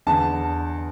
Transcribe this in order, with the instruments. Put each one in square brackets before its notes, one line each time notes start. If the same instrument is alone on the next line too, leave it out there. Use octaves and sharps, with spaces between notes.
[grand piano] E2 D3 A5